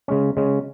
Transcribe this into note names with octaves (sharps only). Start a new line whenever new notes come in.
C#3 G#3 C#4
C#3 G#3 C#4